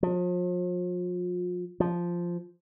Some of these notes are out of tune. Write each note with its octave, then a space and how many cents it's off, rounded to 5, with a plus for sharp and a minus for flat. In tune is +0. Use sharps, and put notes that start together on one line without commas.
F3 +40
F3 -5